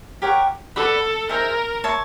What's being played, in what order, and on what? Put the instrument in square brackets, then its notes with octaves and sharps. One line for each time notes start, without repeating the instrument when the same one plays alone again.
[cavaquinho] G4 A#4 C#5 F#5
[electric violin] A4 [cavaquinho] B4 D5 F#5 B5
[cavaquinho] D#4 G#4 C5 E5 [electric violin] A#4
[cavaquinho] C#5 E5 A5 C6